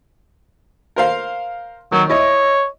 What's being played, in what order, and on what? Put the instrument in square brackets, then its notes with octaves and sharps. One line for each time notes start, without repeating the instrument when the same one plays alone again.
[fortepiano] A#4 C5 F5
[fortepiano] D#3 [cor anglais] F#3
[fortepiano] E4 D#5 [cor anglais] C#5